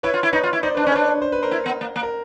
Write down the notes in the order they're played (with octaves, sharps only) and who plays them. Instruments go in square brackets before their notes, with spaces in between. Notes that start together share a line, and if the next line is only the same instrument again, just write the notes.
[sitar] E4 [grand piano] B4 C#5
[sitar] F4
E4
[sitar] D#4 [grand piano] B4 C#5
[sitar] F4
E4
[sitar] D#4 [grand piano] C5 D5
[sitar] D4 [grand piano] B4
[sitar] C#4 [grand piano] C5
[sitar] D4 [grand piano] B4 C#5
[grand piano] C5
B4
A#4 C5
[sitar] E4
B3
A#3
A#3
[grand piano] A#4